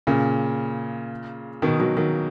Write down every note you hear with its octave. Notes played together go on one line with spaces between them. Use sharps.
A#2 C#3
B2 D#3
D#3 F#3
D#3 F#3